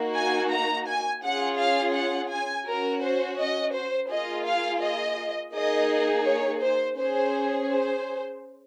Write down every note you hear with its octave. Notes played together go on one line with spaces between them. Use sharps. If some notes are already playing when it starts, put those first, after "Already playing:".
Already playing: A#3 D#4 F#4
G#5
A#5
G#5
C#4 F4 G#4 F#5
F5
F#5
G#5
C#4 F#4 A#4
C5
D#5
C5
A#3 F4 G#4 D#5
F5
D#5
A#3 D#4 G#4 D#5
C#5
C5
C#4 G#4 C5
C5